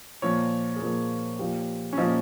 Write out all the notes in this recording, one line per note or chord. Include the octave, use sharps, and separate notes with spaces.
A#2 F3 C#5
G#4
A#2 F3 A#4
A#2 F3 G4
C#4
A#2 F3 D#4